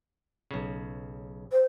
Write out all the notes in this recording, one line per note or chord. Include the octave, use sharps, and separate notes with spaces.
B1 C#3
C5